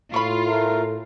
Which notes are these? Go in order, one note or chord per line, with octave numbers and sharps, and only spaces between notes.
A2 F4 B5 C#6
A3 A#4